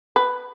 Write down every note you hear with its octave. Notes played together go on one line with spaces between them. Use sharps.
B4